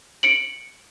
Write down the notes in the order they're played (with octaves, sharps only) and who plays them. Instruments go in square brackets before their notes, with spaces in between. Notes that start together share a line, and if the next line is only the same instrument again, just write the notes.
[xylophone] C#7 D7 F#7